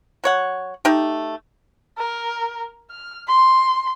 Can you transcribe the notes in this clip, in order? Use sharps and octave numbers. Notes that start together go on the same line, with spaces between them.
F#3 C#5 F#5
A3 D#4 G4
A#4
F6
C6